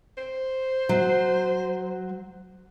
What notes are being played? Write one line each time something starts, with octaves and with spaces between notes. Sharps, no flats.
C5
F#3